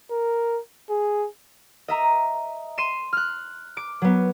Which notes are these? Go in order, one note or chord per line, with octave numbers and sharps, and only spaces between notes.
A#4
G#4
D#5 E5 A#5
C6 C7 D#7 E7
F6 F#6
D6 D7
F#3 B3